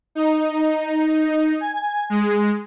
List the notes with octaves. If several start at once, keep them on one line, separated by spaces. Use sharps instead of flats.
D#4
G#5
G#3